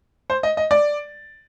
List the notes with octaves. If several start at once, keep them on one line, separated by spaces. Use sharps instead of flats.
C5
D#5
D#5
D5